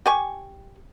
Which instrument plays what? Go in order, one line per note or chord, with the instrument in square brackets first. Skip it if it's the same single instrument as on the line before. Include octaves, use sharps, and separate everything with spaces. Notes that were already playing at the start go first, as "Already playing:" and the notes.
[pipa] G4 G#5 C#6